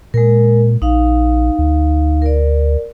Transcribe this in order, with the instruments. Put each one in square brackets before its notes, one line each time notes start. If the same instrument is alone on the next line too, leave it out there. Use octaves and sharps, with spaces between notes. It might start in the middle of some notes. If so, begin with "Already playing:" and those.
[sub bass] A#2 [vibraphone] G#3 A#4
[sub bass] A#1 [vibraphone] D#4 F5
[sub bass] D2
[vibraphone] A#4 D5